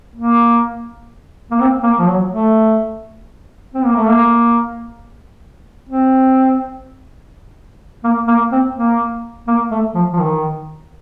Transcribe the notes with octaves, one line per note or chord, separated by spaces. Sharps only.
A#3
A#3
C4
A#3
F3
F#3
A3
C4
A#3
A3
A#3
C4
A#3
A#3
C4
A#3
A#3
A3
F3
F3
D#3